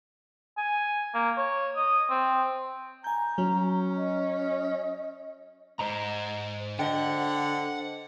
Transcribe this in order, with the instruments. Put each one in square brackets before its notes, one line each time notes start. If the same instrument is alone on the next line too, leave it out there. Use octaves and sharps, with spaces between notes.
[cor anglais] G#5
A#3
C#5
D#5
C4
[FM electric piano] G#5 G6 [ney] A#5
[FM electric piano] F#3 [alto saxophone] C#4
[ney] D#5
[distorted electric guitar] G#2 [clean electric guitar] C5 D#5 A#5
[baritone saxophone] D3 [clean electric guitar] C5 D#5 G5 [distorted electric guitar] F#5